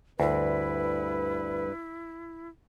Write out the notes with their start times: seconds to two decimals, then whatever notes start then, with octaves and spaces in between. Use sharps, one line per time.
0.20 D2 G2 E4 B4